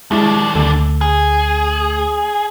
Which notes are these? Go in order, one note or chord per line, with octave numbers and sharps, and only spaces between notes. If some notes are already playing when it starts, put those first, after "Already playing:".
D#2 G#3 D4 E4
D2 A3
G#4